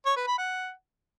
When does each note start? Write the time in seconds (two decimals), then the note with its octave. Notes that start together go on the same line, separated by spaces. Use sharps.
0.06 C#5
0.16 B4
0.27 B5
0.38 F#5